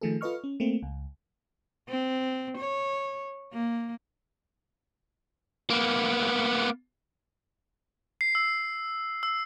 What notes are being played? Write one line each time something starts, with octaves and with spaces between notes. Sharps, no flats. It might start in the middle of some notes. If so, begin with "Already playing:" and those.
D#3 F3 A3 G#4 A4
F4 A4 B4 D#5 C#6 F6
C#4
A3 A#3 C4
C#2
C4
C#5
A#3
A#3 B3
C7
E6
E6